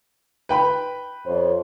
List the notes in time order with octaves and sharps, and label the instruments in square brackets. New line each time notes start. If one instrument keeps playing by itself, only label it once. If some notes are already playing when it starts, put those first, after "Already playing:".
[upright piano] B4 G5 B5
[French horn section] F2 C5 C#5